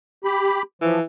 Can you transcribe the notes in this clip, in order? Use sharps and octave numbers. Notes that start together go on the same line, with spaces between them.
G4 B5
E3 F3